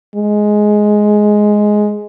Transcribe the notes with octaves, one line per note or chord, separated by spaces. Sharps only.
G#3